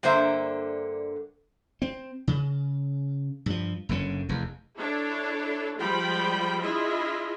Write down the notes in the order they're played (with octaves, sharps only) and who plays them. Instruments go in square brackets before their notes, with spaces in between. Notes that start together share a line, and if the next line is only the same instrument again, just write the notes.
[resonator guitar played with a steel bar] G2 D3 A#3 C5 E5
[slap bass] C4
C#3
G2 F3
F#1 F#2 D3 C#4
F1 E2
[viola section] D4 E4 A4 C#5
F3 G3 G#3 F4 G5 B5
D4 E4 F4 G#4 D#5 E5